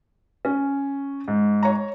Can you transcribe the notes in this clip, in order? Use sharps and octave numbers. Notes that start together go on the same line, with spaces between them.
C#4
G#2
C#5 A#5